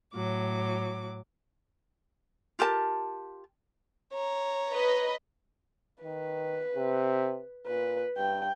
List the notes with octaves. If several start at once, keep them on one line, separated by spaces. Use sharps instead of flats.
A2 F#3 D6
F4 G4 A#4 A5
C#5 A#5
B4 D#5
D#3 B4
C3
A#2 B4
G2 G5